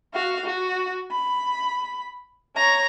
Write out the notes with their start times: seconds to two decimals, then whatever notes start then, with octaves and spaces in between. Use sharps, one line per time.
0.14 F#4 F5
0.45 F#4
1.12 B5
2.57 C#5 A#5